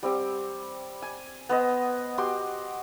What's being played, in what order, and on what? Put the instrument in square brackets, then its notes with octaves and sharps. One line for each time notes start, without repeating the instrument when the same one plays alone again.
[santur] G3 C4 G4
G#5
B3 C5 D#5
F#4 G4 C6